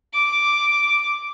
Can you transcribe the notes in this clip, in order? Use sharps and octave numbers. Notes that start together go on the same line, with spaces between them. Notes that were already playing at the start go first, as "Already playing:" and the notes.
D6